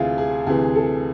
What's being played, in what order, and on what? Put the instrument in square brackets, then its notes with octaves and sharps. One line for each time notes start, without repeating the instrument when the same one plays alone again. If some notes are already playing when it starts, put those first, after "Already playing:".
Already playing: [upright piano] D2 C3 E3 E4 F4 G#4
G#4
D2 C3 E3 G#4
A4